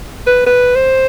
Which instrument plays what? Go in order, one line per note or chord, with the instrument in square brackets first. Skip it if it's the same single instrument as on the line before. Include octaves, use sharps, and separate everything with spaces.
[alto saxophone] B4
B4
C5